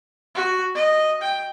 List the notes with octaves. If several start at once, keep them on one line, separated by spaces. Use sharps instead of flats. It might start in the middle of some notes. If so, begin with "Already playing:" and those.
F#4
D#5
G5